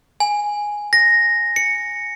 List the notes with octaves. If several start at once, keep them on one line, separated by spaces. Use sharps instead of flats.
G#5
A#6
C#7